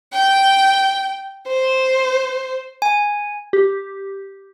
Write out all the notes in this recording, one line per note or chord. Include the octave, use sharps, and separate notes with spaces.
G5
C5
G#5
G4